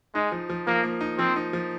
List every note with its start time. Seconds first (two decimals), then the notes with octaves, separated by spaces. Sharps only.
0.15 G#3 D#4
0.32 F3
0.50 F3
0.67 F3 A#3
0.83 A#3
1.01 D#4
1.18 F3 C4
1.36 D#4
1.53 F3